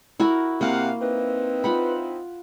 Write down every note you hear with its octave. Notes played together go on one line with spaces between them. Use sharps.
E4 F#4 A#4
C3 A#3 F5 F#5
C4 D#4 E4 B4
F4 F#5 B5